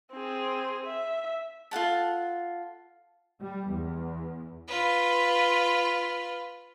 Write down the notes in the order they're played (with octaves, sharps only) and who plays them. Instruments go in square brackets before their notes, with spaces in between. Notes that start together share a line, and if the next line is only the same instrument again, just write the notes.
[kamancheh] C4 G#4
E5
[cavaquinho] F4 A4 F#5 A5
[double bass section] G3
E2
[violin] F4 B4